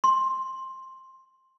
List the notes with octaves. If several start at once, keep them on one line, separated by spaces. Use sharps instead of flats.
C6